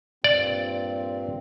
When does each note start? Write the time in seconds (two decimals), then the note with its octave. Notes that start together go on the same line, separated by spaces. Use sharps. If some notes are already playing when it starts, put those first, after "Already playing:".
0.24 G2 A#2 C4 D5